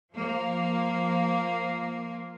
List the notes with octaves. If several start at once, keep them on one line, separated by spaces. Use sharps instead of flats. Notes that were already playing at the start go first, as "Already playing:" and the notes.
F3 A#3